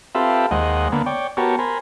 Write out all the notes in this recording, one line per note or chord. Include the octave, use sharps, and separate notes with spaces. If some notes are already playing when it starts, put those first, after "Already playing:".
C4 F4 G4 A4 B4 E5
D#2 G#3 C5 D#5 F#5
D3 A#3 B3
C#5 D5 G5
B3 F#4 G4 A#4 C#5 A5
A#4 C5 G#5 B5